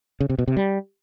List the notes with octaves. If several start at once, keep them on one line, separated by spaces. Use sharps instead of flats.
C#3
C3
B2
C3
G3